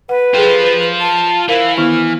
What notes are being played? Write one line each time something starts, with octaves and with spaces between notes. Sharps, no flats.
B4 F#5
F4 G#4 A4 C5 G5
A5
E3 A#4 C5 F5
D#3 B3 E4 F6